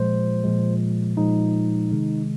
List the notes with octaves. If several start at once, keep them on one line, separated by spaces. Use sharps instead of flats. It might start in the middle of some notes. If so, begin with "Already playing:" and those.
Already playing: A#2 F3 G#3 C5
A#2 F3 G#3
A#2 F3 G#3 D#4
C3 D#3 G#3